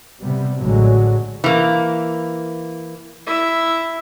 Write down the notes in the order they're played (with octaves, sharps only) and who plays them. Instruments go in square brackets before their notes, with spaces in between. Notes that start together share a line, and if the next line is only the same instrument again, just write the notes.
[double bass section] C3 G3 B3
A1 A2 D3 F#3 G#3
[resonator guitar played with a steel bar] E3 A#3
[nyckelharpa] E4 E5